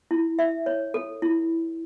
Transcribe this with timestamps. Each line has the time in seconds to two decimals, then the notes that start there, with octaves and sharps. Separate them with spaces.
0.11 E4
0.39 E5
0.66 C#5
0.94 A4
1.22 E4